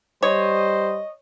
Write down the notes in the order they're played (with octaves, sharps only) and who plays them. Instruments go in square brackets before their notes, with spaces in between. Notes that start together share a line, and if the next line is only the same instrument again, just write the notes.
[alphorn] G3 [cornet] C5 [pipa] C#5 [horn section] D#5